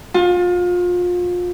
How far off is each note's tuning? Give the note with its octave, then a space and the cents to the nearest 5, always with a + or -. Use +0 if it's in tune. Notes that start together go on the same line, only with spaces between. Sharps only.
F4 +30